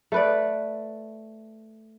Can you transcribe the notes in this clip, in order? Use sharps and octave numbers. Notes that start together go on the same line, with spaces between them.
A3 B4 D5